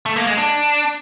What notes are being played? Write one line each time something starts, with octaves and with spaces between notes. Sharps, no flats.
A3
A#3
G#3
D4